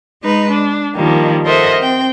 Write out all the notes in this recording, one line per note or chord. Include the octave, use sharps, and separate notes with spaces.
G#3 D#4 B4
D4
D#3 F3 G3 A#3
A4 A#4 C5 D#5 E5 F#5
C4 G5